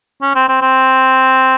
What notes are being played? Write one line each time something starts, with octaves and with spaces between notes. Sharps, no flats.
C#4
C4
C4
C4